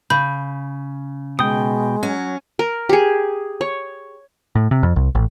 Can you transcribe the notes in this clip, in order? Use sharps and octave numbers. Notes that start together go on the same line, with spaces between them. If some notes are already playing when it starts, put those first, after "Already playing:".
C#3 B5 G6
B2 G#3 G5 D#6
F#3 C#4
A#4
G4 G#4
C#5
A2
C3
F2
C2
A1